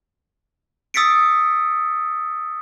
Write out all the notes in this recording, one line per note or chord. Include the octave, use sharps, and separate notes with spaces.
D#6 E6 A6 B6 C#7 D7